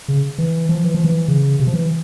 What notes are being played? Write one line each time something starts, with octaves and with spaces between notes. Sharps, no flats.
C#3
E3
F3
E3
F3
E3
C#3
C3
F3
E3